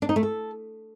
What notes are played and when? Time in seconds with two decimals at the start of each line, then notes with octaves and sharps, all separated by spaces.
0.02 D4
0.09 D#4
0.16 A3
0.23 A4